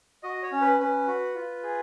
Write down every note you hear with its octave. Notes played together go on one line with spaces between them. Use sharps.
F#4 D#5
C#5
C#4
B4
C#4 B4
F#4
F4
G#4